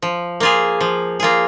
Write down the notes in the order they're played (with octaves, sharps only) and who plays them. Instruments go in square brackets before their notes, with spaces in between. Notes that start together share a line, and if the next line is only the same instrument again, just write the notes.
[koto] F3
A#3 F4 G#4
F3
A#3 F4 G#4